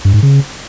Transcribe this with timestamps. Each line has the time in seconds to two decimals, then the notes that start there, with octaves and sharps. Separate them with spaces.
0.05 G2
0.14 G#2
0.23 C#3